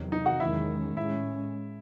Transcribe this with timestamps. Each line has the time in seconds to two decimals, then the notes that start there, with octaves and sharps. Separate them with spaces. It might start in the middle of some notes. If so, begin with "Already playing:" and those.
Already playing: E2 C3 D#3 F#3
0.12 D#4 D#5
0.26 F#4 F#5
0.40 E2 D#3 G#3 C#4 E4 E5
0.96 A2 G#3 C#4 E4 E5